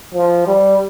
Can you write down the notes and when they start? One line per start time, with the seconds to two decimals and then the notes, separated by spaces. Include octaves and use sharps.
0.14 F3
0.47 G3